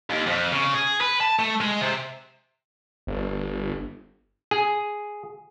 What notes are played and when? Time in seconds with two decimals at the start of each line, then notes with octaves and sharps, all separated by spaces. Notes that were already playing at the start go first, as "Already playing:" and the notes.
0.10 D#2
0.26 F2
0.52 C#3
0.75 G#4
1.01 B4
1.21 A5
1.39 A3
1.60 G#3
1.81 C3
3.07 G1
4.51 G#4